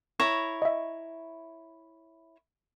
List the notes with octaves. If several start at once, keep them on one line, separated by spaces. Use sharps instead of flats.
E4 C#5 A#5 C#6
D#5 E5